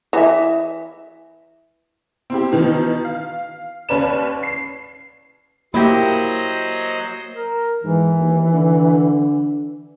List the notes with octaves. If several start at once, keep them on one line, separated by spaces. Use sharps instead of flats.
E3 E5
C4 E4 G4
B2 D#3 E3
F5
D#2 C#4 B4 D5 E7
C7
F#3 A#3 E4 G4 C5 D#5
A#4
G#2 E3
D#2
D3